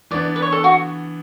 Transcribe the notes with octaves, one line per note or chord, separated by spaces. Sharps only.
E3 B3 D4 D5
B4
C#5
A4
F#4